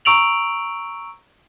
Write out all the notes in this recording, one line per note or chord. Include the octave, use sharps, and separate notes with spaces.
A#5 C#6 E6 D7 F7 F#7